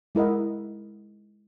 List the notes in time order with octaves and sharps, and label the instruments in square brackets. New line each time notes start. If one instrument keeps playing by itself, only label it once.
[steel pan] G#3 E4 A#4 D#5 F#5